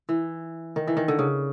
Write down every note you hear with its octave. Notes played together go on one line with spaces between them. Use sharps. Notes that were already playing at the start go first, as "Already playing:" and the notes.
E3
D#3
E3
D#3
D3
C#3